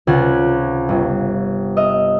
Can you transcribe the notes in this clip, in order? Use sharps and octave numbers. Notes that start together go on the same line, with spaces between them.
C#2 C3 F#5 G#5 F#6
G1
D#5 E5 F6